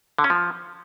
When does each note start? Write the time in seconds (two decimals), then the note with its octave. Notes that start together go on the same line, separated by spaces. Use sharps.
0.19 D3
0.24 C#4
0.30 F3